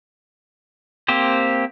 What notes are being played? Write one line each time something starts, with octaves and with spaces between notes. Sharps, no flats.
A#3 C4 G4 C5